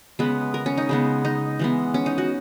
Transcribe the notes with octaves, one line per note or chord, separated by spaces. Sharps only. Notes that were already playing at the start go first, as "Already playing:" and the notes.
C#3 G#3 B3 B4
A#4
C#4
D#4
C#3 G#3 B3
D#4
E3 G#3 B3
C#4
D#4
F#4